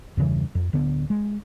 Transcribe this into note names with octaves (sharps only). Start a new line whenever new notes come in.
E2 G2 C#3 E3
F2
D1 D3 B3
G#3